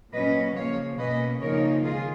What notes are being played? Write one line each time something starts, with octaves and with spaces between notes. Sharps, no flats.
A#2 F#3 C#4 B4 D#5
C#3 F3 A#3 C#5 F5
B2 A#3 C#4 B4 D#5
C#3 F3 A#3 D#4 A#4 C#5
D#3 G#3 F4 G#4